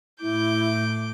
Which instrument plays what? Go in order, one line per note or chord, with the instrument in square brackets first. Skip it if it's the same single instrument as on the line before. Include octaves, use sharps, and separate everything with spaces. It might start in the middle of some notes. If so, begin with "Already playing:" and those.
[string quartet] A2 D6 G6 [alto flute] E4